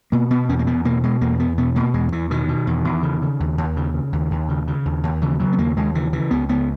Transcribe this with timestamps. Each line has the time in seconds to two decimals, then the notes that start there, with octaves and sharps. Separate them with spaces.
0.12 B2 A#3
0.30 B2 B3
0.49 E2 C#4
0.59 A#3
0.67 E2 B3
0.85 B2 A#3
1.03 B2 G#3
1.21 E2 A#3
1.39 E2 B3
1.58 B2 B3
1.75 B2 A#3
1.94 E2 G#3
2.12 E2 E3
2.30 B2 D#3
2.49 B2
2.67 E2
2.85 E2
3.03 C#3
3.22 C#3
3.40 D#2
3.58 D#2
3.77 C#3
3.94 C#3
4.13 D#2
4.31 D#2
4.49 C#3
4.68 C#3
4.85 D#2
5.03 D#2
5.21 C#3 E3
5.39 C#3 F#3
5.52 B3
5.58 D#2 A#3
5.77 D#2 G#3
5.95 C#3 E3
6.13 C#3 E3
6.31 C#2 B3
6.49 C#2 B3